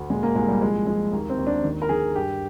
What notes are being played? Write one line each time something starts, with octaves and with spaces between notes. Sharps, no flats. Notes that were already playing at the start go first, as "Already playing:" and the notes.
Already playing: D2
A#2 G#3
A#3
C2 G#3
G3
F3 G#3
F3 G#3
D#2 A#3
C4
D#2
D4
D#3
A#4
D#3 G#4
G2 G4